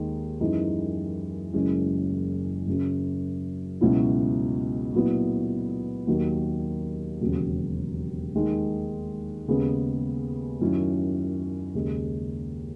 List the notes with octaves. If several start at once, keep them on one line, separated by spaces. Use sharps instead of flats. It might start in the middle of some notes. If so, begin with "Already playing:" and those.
Already playing: D#2 D#3 G#3 D#4
F#2 E3 G#3 D#4
F#1 F#2 E3 G#3 C#4
F#2 C#3 F#3
C#2 B2 F#3 C#4 E4
A#2 F#3 B3 E4
D#2 D#3 F#3 A#3
E1 D#2 C#3 F#3 C#4
D#2 D#3 G#3 D#4
D#2 C#3 G#3 B3
F#2 D#3 F#3 C#4 E4
D#2 C#3 G#3